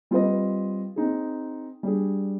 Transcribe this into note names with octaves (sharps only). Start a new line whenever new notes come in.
G3 C4 F4 B4 D#5
C4 D#4 G#4
G3 D4 G#4